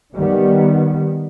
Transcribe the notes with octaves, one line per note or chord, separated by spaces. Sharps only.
D#3 G3 B3